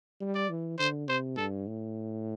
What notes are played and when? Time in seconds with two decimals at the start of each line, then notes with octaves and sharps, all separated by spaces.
0.20 G3
0.35 D5
0.49 E3
0.79 D3 C5
1.08 C3 C5
1.37 G2 A4
1.67 A2